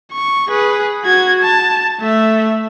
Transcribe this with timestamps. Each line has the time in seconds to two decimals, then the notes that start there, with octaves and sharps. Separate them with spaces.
0.13 C#6
0.48 G#4 B4
1.04 F#4 G#6
1.43 A5
2.00 A3 E5